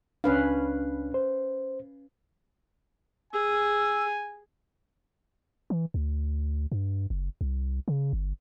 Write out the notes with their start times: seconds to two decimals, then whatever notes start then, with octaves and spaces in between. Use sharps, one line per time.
0.24 C#2 C#4 D4 B4 F5
1.14 C5
3.33 G#4 G#5 E6
5.70 E3
5.94 D2
6.72 G2
7.10 F#1
7.41 C2
7.88 C#3
8.13 G1